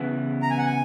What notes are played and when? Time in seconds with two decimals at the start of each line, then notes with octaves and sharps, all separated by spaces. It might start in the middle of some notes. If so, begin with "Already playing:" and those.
Already playing: C#3 E3 B3 E4
0.42 A#5
0.50 G#5
0.58 F#5
0.66 G#5